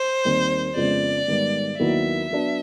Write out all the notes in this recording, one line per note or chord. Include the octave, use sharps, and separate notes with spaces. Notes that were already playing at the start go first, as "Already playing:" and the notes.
Already playing: C5
D#2 D#3 G3 C4
F2 C#3 F3 G#3 B3 D5
G#2 D#3 G3 B3
D#2 D#3 F#3 B3 E4 E5
F#3 B3 D4